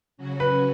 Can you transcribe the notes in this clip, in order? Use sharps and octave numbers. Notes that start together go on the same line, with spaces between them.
C#3 F#3 C#4 F#4
B4